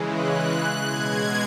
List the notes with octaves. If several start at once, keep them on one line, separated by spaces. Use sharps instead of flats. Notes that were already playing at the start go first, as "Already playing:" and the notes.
Already playing: C#3 E3 G#3
F#6
B2 G#3 G#6